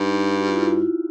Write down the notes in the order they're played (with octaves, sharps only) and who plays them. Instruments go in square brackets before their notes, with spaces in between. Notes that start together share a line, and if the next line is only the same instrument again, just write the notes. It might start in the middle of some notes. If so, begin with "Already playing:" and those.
Already playing: [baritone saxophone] G2 [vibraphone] D#4
[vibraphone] F#4
F4
E4